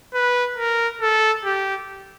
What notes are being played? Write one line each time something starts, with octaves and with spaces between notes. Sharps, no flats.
B4
A#4
A4
G4